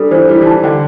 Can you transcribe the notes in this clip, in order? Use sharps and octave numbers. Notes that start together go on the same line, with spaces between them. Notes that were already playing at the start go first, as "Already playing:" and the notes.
Already playing: G3 D4 A4
E3 C5
G3 E4
E3
A5
E3
D3 G5